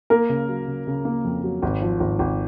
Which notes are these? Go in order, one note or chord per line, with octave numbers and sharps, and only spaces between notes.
A#3 A#4
C#3
F#3
C#3
C#3
A#3
F2
F#3
G#1
F3
G#1
G#1